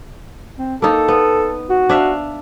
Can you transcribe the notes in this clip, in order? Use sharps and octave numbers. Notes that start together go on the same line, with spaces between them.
C4
A#3 D#4 A4
B3
F#4
D4 E5 F5